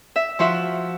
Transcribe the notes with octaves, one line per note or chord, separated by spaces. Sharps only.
E5
F3 F4 F#4 E5